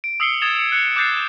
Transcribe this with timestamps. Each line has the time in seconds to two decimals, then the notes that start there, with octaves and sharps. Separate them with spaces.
0.04 D7
0.20 D#6 E6 C7 C#7 G7
0.41 D#6 G#6 A6 E7 F7 G7
0.59 C#7
0.72 F#6 C#7 D7
0.96 D6 F#6 G6 A6 C7